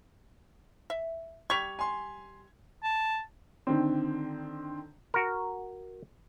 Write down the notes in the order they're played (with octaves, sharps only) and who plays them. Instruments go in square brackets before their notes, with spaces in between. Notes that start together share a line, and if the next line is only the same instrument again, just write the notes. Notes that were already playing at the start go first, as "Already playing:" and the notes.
[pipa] E5
[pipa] G3 C#6 [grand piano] G#6 B6 F7
[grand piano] G#5 C6
[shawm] A5
[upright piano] D3 D#3 C4
[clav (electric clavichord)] F#4 A#4